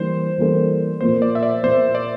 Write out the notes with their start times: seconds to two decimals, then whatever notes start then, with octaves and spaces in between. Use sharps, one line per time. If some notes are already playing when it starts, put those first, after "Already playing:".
Already playing: E3 G3 A#3 D4 C5
0.38 E3 G3 A#3 D4 A4
1.01 A#2 F3 A#3 C5
1.22 D5
1.35 E5
1.43 D5
1.63 A#2 F3 A#3 C5
1.95 D5